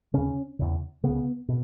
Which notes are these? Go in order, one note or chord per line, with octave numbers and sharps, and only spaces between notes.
D#2 C#3 C#4
E2 C#3
C#2 C#3 B3
B2